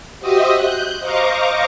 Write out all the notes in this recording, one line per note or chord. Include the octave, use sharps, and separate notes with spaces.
F#4 G4 C5 D#5 E5 D#6
F#6 G6
C5 D#5 F5 A#5 C#6 D6